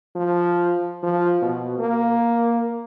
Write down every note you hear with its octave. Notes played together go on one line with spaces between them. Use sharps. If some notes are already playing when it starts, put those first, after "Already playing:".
F3
F3
B2
A#3